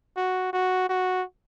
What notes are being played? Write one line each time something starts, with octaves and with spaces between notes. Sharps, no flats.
F#4
F#4
F#4